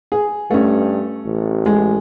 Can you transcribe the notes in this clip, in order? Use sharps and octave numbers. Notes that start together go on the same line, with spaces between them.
G#4
G2 A3 C#4
A1
G#3